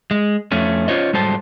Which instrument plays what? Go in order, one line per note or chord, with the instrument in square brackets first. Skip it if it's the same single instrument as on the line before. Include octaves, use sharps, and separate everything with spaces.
[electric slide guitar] G#3
F2 A3 C#4
C#4 F4 C5 C#5 D#5
G#2 F#3 G3 A4 C5 A5